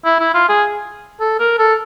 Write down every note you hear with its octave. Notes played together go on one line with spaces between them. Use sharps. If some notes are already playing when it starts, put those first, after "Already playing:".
E4
E4
F4
G#4
A4
A#4
A4